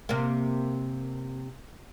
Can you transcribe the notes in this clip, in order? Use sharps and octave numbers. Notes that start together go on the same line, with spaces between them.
C3 A#3